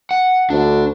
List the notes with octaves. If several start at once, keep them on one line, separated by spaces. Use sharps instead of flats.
F#5
D2 D4